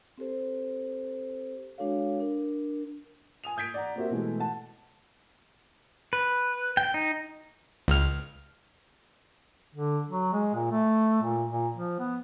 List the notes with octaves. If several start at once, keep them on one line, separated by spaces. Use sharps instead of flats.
C4 G4 A4 C5
G#3 D4 F#4 A4 C#5 F5
D4 A#4
G#5 D#6 F7
D#6 G6 G#6 B6 D7
D5 F#5 A#5
A#3 C4 F#4 G4 A#4 E5
B2 E3 G#3 A3
F#5 A5
B4
G5
D#4
C#2 F6
D3
F#3
G#3
A#2
A3
A#2
A#2
F3
B3